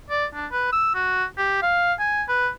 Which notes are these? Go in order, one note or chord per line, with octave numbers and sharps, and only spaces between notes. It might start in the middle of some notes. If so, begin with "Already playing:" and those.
D5
D4
B4
E6
F#4
G4
F5
G#5
B4